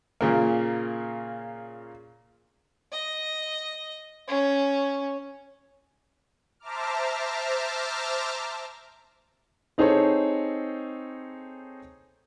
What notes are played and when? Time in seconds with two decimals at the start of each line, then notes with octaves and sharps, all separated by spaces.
0.21 A#2 C#3 A#3
2.92 D#5
4.27 C#4
6.60 C5 E5 A5 A#5 D6 F6
9.78 C4 D#4 G#4 A4 C5 C#5